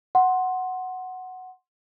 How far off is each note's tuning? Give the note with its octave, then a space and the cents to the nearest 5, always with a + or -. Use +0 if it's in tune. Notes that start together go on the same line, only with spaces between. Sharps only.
F#5 +0 C6 +10